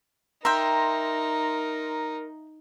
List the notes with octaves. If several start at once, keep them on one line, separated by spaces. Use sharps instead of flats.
D#4 A#4 E5 G5 A#5 C6